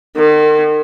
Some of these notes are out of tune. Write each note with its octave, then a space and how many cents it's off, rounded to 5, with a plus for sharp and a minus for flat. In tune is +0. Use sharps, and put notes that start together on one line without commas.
D#3 -40